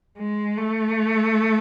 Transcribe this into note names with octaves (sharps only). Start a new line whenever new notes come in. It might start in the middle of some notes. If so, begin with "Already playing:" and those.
G#3
A3